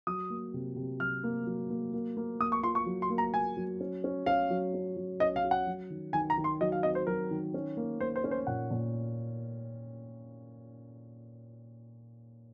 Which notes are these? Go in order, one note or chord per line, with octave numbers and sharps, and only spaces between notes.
F#3 D#6
A#3
C3
C3
F#3 F6
A#3
F#3
A#3
A#3
A#3
A#3 D#6
C#6
F4 C6
C#6
F#3
C6
A#3
A#5
A#3 G#5
F#3
C#4
C#4
C#4 F5
F#3
C#4
F#3
C#4 D#5
F5
F#4
F#5
F#3
D#3
D#3 G#5
A#5
D#3
C6
F#3 D#5
F5
C4 D#5
C5
F#3 A#4
D#3
C#4
A#3
A#3 C5
C5
C#4
C5
A#2 F#5
A#2